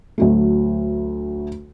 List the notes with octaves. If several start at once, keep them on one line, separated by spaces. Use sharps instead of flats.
D2 F#3 A3